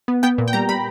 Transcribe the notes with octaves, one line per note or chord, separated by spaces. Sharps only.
B3
B3 G5
A#2
G5
G3 A#5
G3 B5